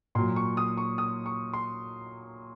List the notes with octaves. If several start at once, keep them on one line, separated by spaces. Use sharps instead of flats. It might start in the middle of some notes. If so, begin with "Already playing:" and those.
A#2 F#3 C6
C#6
D#6
C#6
D#6
C#6
C6